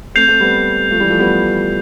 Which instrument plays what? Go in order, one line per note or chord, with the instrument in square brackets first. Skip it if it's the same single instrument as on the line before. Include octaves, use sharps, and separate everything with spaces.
[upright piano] A3 C4 [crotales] G6 C7 F7
[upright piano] A3 C4
G3 B3
F3 A3
E3 G3
F3 A3
G3 B3